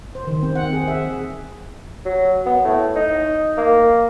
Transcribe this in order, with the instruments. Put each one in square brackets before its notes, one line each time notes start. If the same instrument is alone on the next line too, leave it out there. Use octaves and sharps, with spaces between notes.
[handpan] C5
D#3
C4
F#5
G#4
E5
[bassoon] F#3
B3
A2
D#4
A#3